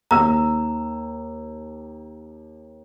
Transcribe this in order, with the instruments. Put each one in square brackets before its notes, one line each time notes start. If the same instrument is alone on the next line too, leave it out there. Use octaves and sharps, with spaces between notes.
[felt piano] D#2 E6 [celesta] A#5